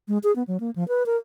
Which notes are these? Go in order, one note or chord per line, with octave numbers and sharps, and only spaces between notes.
G#3
G#4
B3
F#3
A#3
F3
B4
A#4